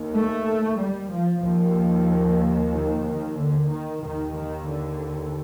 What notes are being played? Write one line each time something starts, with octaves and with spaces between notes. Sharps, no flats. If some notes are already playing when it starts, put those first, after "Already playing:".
Already playing: D#2
A3
G3
F3
D#2 F3
D#3
D#3
D3
D#3
D#2 D#3
D#3
D3